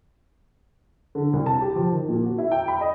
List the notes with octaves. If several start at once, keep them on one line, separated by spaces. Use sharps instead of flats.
D3
C2
A5
G4
F3
D#3
A#2
F#4
E4
G5
B5
D#5